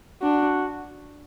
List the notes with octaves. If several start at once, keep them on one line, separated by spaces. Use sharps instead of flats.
D4 F#4